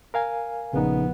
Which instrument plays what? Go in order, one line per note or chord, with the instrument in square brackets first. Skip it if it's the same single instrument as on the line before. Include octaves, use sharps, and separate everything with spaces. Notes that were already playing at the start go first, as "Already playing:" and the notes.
[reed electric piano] A#4 F5 G#5
[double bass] A#1 B3 [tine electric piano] C#3 D#4